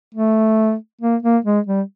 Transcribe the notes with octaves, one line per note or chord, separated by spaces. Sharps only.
A3
A#3
A#3
G#3
G3